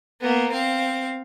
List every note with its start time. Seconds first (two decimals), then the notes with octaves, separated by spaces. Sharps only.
0.20 A#3 B3
0.51 C4 F5